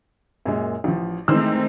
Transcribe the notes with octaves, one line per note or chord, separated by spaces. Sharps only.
F#2 A#2 G#3
A1 F3
D#3 E3 G#3 A3 C4 D#4 C5 E6